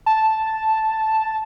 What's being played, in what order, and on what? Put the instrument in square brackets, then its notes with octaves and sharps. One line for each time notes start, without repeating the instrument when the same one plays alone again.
[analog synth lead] A5